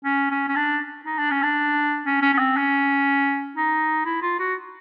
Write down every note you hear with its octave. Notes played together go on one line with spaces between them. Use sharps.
C#4
C#4
C#4
D4
D#4
D4
C#4
D4
C#4
C#4
C#4
C4
C#4
D#4
E4
F4
F#4